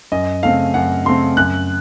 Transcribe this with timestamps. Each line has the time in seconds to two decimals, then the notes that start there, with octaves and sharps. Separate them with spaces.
0.12 F#2 D#5
0.43 C#3 A3 C4 F5
0.74 F#2 F#5
1.05 C#3 A3 C4 C6
1.36 F#2 F#6